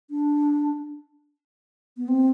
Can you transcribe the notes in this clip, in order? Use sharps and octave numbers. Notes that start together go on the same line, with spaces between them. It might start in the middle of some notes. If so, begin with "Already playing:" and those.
D4
B3
C4